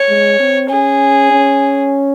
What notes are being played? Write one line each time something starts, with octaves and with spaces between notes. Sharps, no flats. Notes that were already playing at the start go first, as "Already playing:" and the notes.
Already playing: C#5
G#3
C4
C#4 G#4
C#4